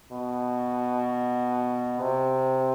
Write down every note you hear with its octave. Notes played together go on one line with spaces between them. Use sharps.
B2
C3